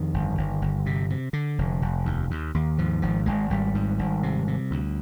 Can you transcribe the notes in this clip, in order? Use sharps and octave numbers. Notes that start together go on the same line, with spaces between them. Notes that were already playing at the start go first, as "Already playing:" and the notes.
Already playing: F2 D#3
G1
G1
G1
C3
C3
D3
F1
F1
D#2
D#2
D#2
G#2 F3
G#1 F3
G#1 G#3
G#1 G3
G#2
G#1
C3
C3
D2